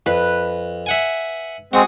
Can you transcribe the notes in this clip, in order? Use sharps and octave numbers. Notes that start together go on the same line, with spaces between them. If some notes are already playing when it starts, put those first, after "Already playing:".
F2 B4
E5 F#5 G#5
G#3 C4 F#4 G#4